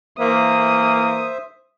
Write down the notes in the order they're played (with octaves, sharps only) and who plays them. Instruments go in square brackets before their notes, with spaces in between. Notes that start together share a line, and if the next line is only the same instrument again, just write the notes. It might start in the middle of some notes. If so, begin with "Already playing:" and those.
[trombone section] E3 A#3 [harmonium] C5 E5 [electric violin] D#6